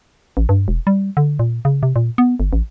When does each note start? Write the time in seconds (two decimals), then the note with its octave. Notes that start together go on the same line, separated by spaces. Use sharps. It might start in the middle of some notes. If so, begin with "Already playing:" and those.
0.37 A1
0.49 G2
0.68 E1
0.87 G3
1.17 D3
1.39 A#2
1.65 C#3
1.83 C3
1.96 A#2
2.18 B3
2.40 G1
2.53 A1